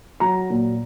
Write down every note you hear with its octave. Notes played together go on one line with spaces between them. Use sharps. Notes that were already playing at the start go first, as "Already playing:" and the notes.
F#3 A#5
A#2